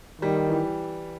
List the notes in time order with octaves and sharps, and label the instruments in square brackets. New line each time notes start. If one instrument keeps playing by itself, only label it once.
[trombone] D#3 [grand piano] G3
[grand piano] E3